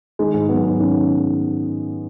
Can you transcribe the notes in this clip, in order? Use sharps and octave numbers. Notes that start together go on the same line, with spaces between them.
D#3 G#3
G#2
F#3 B3
G#2
D#3 C#4